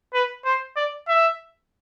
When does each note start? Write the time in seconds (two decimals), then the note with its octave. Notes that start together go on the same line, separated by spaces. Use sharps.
0.14 B4
0.45 C5
0.76 D5
1.08 E5